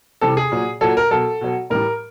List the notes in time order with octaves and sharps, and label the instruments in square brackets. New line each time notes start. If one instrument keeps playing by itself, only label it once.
[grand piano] C3 E3 G3 A4
G#4
A#2 F#3
A#2 F#3 A4
A#4
B2 F#3 A4
B2 F#3
A2 E3 G3 A#4